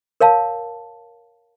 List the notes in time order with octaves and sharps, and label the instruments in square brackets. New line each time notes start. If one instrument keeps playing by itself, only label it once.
[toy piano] A#4 C#5 F5 A5